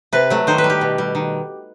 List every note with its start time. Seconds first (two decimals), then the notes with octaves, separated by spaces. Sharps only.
0.13 C3 B4
0.30 F#3 A3
0.47 D#3 C5
0.58 B4
0.64 G3
0.70 G4
0.81 B2
0.98 G3
1.15 D#3